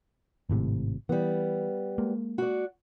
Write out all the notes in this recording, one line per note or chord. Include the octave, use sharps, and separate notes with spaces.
G#1 A2 C3
E3 G3 B3
G#3 A#3
F#4 D5